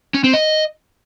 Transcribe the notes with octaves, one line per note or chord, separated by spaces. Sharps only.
C#4
C4
D#5